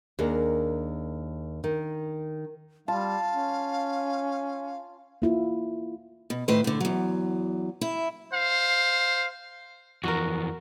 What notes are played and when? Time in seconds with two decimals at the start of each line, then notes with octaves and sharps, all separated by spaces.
0.19 D#2 D4 G#4 A#4
1.64 D#3
2.88 G3 F4 F5 A5
3.33 C#4
5.22 A#3 E4 F4
6.30 B2
6.48 A2 D#3 B4 C5
6.64 A2 D3
6.80 E2 F#3
7.81 E4
8.34 C5 F5
10.04 F2 E3 F#4 A#4